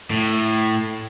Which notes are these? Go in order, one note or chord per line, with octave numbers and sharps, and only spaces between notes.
A2